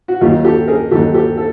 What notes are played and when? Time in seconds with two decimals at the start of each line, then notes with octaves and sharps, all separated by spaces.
0.08 F#4
0.21 D#2 D#3 F#3 F4 G4
0.45 G4 A4
0.68 G#4 A#4
0.91 D#2 D#3 F#3 G4 A4
1.14 G4 A4
1.37 A4